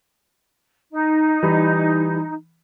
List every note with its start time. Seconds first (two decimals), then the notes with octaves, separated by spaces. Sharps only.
0.92 D#4
1.43 E3 G3 B5